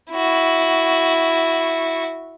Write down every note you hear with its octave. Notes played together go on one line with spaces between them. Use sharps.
E4 F#4